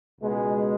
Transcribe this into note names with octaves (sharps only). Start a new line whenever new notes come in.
C#2 B2 G#3